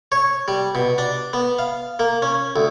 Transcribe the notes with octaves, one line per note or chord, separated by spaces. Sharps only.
C#5
G3
B2
D4
B3
F5
A#3
C#4
D2